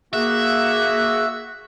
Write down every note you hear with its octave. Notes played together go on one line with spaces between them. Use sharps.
A#3 F#4 G#4 E5